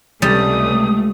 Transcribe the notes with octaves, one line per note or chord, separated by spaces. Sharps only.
C#2 C3 G3 A3 D#6